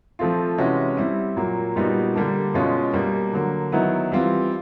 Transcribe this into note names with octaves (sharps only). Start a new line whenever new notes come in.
F3 A3 C4 F4
C3 E3 G#3 C#4 F#4
G3 C4 E4
A#2 F#3 A#3
A#2 G3 B3 D#4 F#4
D3 G3 A#3 D4
B2 G#3 C#4 F4
B2 G3 A#3
D3 F#3 A#3
D#3 F#3 B3 E4
E3 G3 C4 F4